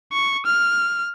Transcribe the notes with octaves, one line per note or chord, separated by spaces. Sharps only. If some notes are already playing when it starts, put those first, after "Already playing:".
C#6
F6